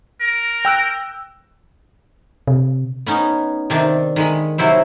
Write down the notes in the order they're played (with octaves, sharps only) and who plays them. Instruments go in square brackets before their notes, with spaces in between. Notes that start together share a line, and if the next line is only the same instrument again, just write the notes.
[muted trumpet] A#4
[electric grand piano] G5 E6 F#6
[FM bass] C3
[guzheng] B3 C#4 D#4
C3 D#3 D4
D#3 G#3 B5
C3 F#3 E4 C5